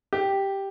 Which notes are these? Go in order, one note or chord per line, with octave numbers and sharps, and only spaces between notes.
G4